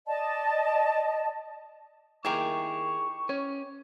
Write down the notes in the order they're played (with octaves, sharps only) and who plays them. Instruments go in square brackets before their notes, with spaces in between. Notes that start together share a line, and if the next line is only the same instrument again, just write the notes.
[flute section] D5 D#5 A5
[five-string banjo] D#3 A#3 [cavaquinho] D#4 G4 [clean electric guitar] E4 G#4 A#4 [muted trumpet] C#6
[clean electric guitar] C#4 [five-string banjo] C#5